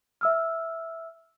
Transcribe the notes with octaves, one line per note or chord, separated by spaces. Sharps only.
E5 E6 F6